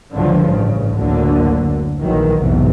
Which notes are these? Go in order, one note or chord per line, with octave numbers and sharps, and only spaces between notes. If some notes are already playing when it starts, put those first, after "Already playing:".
C#2 G2 D3 F3
A1 C#3
F#1 D2 A2 D3 A#3
A#1 D#3 E3 F#3
B1 E2 G#2 C3